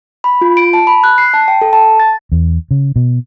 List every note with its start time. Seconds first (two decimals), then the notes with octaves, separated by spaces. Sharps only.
0.24 B5
0.41 F4
0.57 D7
0.73 A5
0.87 B5
1.04 F#6
1.18 C7
1.34 A5
1.48 G5
1.62 A4
1.73 A5
2.00 A6
2.32 E2
2.71 C#3
2.96 B2